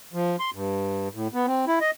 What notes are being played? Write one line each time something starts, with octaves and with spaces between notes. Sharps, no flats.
F3
C6
G2
A2
B3
C4
E4
D#5